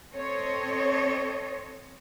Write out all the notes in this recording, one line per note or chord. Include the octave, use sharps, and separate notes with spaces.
C4 A4 C5 C#5 D#5